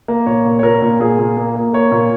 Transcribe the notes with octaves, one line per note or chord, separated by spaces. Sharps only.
A#3
A#2 C#5
A#2
C#5
A#2 A#4
A#2
A#2 G#4
A#2
A#3
A#3
A#3 C#5
A#2